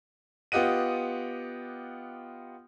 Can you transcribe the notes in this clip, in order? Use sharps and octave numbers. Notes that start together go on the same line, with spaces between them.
B3 F4 G4 D#5 F#5 D#7